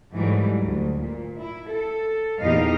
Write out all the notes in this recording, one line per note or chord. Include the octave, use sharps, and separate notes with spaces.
G#2 E3 F#3 G3 A3
D2
A#2
E4
A4
E2 A#2 D#4 G4 D#5 F5